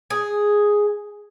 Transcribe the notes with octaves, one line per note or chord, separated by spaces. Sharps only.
G#4